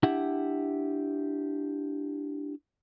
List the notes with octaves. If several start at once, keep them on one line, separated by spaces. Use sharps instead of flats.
D4 E4 G4 E5 F#5